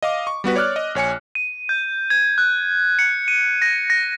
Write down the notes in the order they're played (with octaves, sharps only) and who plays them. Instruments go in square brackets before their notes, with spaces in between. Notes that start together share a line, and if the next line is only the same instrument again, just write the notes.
[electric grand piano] D#5 F5 D6
C#6
G3 B3 F#4 B4
C#5 D5 D6 F6 F#6
D#5
A#1 C#5 G#5 C#7
[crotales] D#7
G6
G#6
F#6
C#7
D#7
A#6
A#6